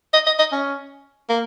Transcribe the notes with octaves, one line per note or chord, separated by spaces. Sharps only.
D#5
D#5
D#5
C#4
A#3